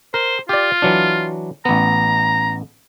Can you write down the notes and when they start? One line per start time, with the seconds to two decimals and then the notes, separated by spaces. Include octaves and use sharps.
0.14 A#4 C5
0.49 F4 G4 D5
0.82 E3 F#3 D4
1.65 A1 B3 A#5